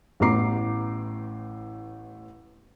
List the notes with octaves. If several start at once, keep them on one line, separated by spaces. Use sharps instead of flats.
A1 A2 B3 A#5 D6 C7